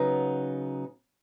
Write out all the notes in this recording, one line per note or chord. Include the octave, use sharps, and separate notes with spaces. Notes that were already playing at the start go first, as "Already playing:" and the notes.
Already playing: C#3 F#3 B3 D#4